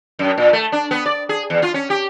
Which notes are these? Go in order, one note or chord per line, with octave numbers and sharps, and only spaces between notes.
F#2
A#2
A3
D4
B3
D5
G#4
E2
F4
C#4
G4